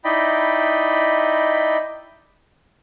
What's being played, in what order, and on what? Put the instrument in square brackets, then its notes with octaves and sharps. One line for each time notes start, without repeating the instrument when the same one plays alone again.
[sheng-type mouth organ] D#4 E4 D5 D#5 G5 B5